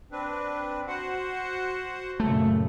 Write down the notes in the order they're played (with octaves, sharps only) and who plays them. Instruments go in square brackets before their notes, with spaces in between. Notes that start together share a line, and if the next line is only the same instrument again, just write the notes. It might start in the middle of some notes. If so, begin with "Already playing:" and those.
[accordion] C4 D4 B4
F#4 C5 F#5
[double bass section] F#2 A#2 C#3 [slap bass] A3